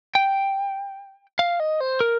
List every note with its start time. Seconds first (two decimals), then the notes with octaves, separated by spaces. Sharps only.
0.15 G5
1.39 F5
1.60 D#5
1.80 C5
2.01 A#4